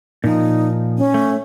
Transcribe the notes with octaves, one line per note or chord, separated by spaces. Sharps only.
A#2 F3 D#4
C#4
A3